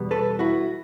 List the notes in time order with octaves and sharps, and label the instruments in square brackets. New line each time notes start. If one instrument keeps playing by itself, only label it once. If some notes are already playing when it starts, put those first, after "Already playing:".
Already playing: [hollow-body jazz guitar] E2 B2 G3 B3
A4 B4
E4 F#4